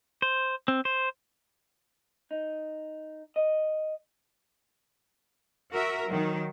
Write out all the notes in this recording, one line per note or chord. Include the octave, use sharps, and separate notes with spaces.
C5
C4
C5
D#4
D#5
F#4 A#4 E5
D#3 F#3